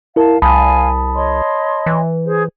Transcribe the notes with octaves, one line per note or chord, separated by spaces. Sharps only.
E4 A#4 F5 A5
C2 F5 G#5 A5 B5 D#6
C#5 D#5 C6
E3
G#4 C5